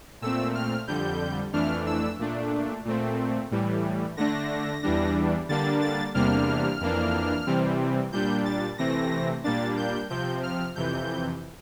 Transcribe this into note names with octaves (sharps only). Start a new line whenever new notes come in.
A#2 A3 C4 E6
F6
F2 D3 G3 G6
F2 E3 A3 D4 F6
E6
A#2 A3 D4
A#2 A3 C4
A2 E3 G3
D3 A3 D4 A#6
E2 E3 G3 D4
D3 G3 A#3 D4 A6
A6
E2 C3 G3 A#3 D4 F6
F2 E3 A#3 D4
C3 E3 G3 C4
A#2 G3 D4 G6
A6
C3 E3 A3 C4 A#6
A#2 G3 A#3 D4 A6
G6
C3 F3 C4 G6
F6
F2 C3 E3 G6